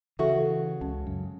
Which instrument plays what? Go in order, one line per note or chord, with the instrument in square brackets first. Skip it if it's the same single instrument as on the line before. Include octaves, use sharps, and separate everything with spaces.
[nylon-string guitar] C#3 F#4 [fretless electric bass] E3 [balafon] A4 E5 C#6
[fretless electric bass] C#2 [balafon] C#4
[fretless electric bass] F#2